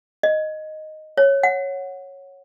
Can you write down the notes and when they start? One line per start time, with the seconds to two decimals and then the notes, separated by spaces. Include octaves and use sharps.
0.23 D#5
1.17 C#5
1.43 F#5